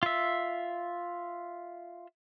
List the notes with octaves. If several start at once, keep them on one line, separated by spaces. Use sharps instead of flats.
F4 E5